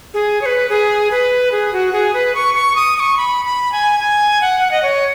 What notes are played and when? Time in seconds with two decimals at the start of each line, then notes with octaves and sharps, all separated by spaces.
0.14 G#4
0.42 C#5
0.46 B4
0.69 G#4
1.11 B4
1.52 G#4
1.73 F#4
1.93 G#4
2.14 B4
2.35 C#6
2.54 C#6
2.76 D#6
2.96 D#6
3.00 C#6
3.17 B5
3.45 B5
3.72 G#5
4.00 G#5
4.41 F#5
4.60 F#5
4.71 D#5
4.83 C#5